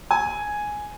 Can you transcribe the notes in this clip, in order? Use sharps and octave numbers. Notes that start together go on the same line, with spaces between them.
G#5